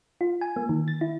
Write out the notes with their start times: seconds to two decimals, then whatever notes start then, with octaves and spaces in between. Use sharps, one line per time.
0.21 F4
0.41 G#5
0.56 A#3
0.69 D#3
0.88 A6
1.01 E4